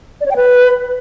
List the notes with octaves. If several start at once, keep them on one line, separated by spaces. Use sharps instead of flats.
D5
C#5
G5
B4